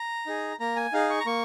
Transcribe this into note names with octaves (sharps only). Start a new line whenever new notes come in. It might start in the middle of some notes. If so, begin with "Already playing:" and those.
Already playing: A#5
D#4 G#4
A#3 A#5
G#5
D#4 G#4 F5
C#6
A#5
A#3 C#6